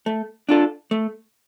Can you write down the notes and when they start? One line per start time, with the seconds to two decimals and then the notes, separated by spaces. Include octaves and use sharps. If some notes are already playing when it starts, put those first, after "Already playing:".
0.06 A3
0.49 D4 F4 A4
0.91 A3